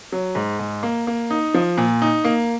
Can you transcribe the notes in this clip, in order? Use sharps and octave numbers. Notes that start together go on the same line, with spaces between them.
F#3
G#2
G#2
A#3
A#3
D#4
F3
A#2
D#4
A#3